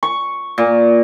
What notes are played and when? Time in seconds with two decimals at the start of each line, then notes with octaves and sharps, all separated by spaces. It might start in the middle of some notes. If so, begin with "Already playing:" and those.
0.03 C#6
0.58 A#2